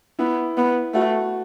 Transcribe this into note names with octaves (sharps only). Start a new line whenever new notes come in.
B3 E4
B3
A3 F#4